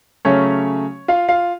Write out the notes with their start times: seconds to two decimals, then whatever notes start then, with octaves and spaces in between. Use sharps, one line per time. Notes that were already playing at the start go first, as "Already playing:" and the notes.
0.25 C#3 F#3 A3 C#4 C#5
1.08 F4 F5
1.29 F4 F5